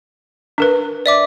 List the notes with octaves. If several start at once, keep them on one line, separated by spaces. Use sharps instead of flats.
D4 A#4 B4
D5 E5 D6